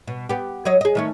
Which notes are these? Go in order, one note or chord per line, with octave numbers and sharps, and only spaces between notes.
B2
B3 G4
F#3 C#5 D#5
G#4 D#5
D#3 A3 C#4